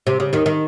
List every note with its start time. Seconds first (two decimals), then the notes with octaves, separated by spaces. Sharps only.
0.07 C3
0.20 C#3
0.33 D#2 D#3
0.46 D#3